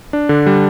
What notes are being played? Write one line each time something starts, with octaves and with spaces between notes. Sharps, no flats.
D4
D3
G3